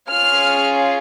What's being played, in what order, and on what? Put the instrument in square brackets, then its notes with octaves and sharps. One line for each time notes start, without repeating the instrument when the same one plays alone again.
[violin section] C#4 F4 G#4 F6